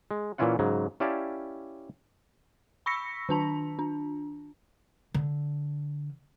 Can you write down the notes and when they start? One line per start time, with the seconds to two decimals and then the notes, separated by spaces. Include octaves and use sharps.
0.11 G#3
0.38 A#2 E3 C#4 E4 F4 F#5
0.59 G#2 C#3 F#3
1.00 C#4 E4 G4 D5 F5 A5
2.86 B5 C#6 E6 A#6 B6 C#7
3.29 D#3 D4 A5
3.79 D4
5.14 D3